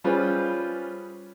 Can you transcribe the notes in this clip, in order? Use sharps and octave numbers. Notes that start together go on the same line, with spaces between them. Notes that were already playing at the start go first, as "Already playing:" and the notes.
G3 C#4 F4 G#4 B4 C5